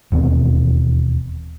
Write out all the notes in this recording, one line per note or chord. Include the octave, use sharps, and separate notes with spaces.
E1 D#2 B2 C4